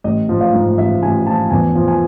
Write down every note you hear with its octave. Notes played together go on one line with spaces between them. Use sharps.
A1 D#5
F3
F5
G#2
A1 E5
A1 G#5
F3 A5
E2 G#5
F3
G#5